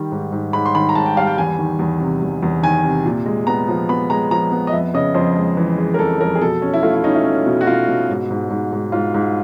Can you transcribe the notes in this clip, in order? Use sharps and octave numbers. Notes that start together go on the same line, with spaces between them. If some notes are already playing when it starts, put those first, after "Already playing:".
Already playing: D#3 G3
G#2
G#2
G#2 B5
C6
D#3 B5
A#5
G#2 A5
G5
G3 F5
G5
E2 G#5
D#3
E2
C3
E2
E2
D#3 G#5
C3
A#2
G#3
B3 A#5
F3
B3 B5
G#3 A#5
F3 A#5
B3
D#5
F2 E5
C#3 D#5
F2 C5
G#3
E3
G#3
A#4
F2 A4
F2 A#4
G#4
B2 A4
C#4
E4
A3 F4
E4
C#4 D#4
E4
C#4
B2
F#4
B2 F4
B2
G#2
G#2
G#2
G#2
G#2 F4
G#2